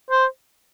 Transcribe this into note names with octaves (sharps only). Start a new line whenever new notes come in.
C5